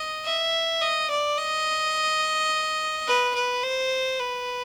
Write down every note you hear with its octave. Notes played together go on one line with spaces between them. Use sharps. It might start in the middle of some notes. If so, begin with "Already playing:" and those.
Already playing: D#5
E5
D#5
D5
D#5
B4
B4
C5
B4